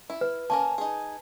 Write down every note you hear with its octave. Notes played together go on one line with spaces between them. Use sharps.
E4
B4
A#3 C#4 A#4 A5
D#4 G#4